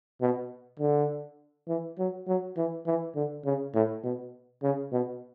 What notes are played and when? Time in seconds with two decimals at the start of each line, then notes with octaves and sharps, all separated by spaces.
0.22 B2
0.80 D3
1.68 E3
1.98 F#3
2.27 F#3
2.57 E3
2.86 E3
3.15 D3
3.45 C#3
3.74 A2
4.04 B2
4.63 C#3
4.92 B2